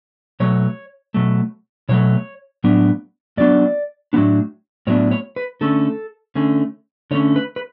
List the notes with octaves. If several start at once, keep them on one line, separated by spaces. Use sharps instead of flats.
B2 F#3 A3 C#5
B2 F#3 A3
B2 F#3 A3 C#5
A2 F#3 B3 D4
A2 F#3 B3 D4 D5
A2 F#3 B3 D4
A2 F#3 B3 D4 C#5
C#5
B4
D3 A3 C#4 A4
D3 A3 C#4
D3 A3 C#4 C#5
B4
B4